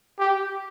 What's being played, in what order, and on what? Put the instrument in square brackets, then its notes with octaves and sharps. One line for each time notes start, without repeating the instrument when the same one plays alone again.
[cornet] G4